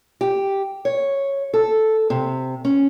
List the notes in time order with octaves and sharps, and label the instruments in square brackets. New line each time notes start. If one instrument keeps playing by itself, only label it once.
[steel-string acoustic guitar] G4
C#5
A4
C3
C#4